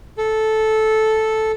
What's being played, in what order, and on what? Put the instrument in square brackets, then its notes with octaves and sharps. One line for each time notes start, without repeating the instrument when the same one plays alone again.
[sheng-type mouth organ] A4